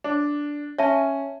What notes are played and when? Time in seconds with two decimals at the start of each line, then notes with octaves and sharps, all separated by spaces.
0.04 D4
0.78 C#4 C#5 E5 A5